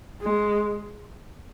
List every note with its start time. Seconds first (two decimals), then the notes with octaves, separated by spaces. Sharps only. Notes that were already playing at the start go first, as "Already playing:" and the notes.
0.22 G#3